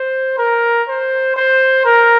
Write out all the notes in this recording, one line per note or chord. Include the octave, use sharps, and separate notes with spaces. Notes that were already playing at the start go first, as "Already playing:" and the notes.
Already playing: C5
A#4
C5
C5
A#4